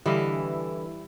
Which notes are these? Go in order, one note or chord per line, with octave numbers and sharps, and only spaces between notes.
D3 E3 G3 E4 D#5 F5